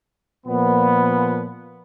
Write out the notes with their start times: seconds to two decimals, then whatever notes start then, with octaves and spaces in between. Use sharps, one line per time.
0.47 A#2 F3 B3